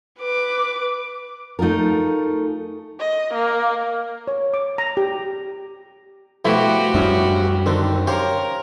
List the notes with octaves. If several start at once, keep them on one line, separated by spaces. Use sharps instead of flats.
B4 D6
A3 D#4 F4 G#4 A#4
D#5
A#3
C#5
D6
A#5
G4
B2 F3 A3 E4 F#4 G4
F#2 F3 G3 C#4 D4 E4
D3 D#3 C4 A4
G4 A#4 C5 C#5 F5